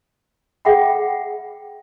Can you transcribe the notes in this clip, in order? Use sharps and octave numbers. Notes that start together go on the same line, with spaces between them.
G#4 E5 F#5 G5 B5